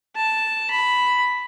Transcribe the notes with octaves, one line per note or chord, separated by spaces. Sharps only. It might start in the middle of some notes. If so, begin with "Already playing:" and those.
A5
B5